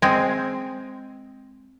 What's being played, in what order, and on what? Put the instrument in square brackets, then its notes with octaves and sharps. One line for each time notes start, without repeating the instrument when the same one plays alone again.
[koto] G#3 C4